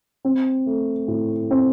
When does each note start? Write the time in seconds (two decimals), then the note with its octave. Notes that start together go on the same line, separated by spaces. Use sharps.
0.25 C4
0.66 A3
1.08 A2
1.51 C4